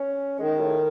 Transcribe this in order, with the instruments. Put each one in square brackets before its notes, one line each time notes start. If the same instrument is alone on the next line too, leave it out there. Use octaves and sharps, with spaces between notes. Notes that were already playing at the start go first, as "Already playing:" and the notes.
Already playing: [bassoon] C#4
[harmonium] D#3 [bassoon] G#3
[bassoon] A2